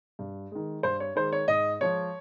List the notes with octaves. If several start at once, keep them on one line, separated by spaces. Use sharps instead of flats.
G2
D#3 G#3
G2 C5
C#5
D#3 G#3 C5
C#5
G#2 D#5
F3 G#3 C#5